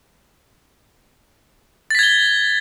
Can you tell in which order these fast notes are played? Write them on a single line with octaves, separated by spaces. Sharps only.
A6 B6 G#6 G7